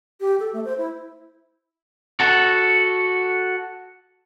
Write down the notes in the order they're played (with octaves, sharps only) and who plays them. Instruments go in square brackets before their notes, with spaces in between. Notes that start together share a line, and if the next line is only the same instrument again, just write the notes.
[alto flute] G4
A4
A3
C5
E4
[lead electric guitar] F#4 A4